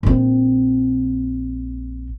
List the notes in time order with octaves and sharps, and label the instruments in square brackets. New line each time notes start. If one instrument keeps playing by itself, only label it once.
[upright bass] A#1 C4